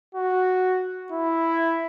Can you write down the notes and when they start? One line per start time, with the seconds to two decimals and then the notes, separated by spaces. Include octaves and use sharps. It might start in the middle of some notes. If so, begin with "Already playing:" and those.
0.15 F#4
1.12 E4